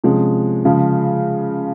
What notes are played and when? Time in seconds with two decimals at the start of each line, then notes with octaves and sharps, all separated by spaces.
0.04 C3 F3 G#3 C#4
0.65 C#3 F3 G#3